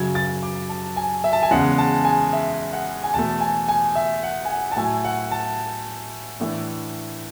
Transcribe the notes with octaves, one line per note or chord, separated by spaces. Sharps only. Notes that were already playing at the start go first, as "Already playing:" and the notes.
Already playing: F#2 C#3 F#3 G#6
A6
D6
A5
G#5
E5
A5
G#5
E2 C#3 G#3 C#4 F#5
A5
G#5
E5
F#5
G#5
E2 B2 A3 A5
G#5
G#5
E5
F#5
G#5
F#5
A5
A2 F#3 A3 G#5
F#5
A5
A2 E3 A3 D4